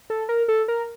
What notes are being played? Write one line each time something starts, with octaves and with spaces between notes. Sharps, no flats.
A4
A#4
A4
A#4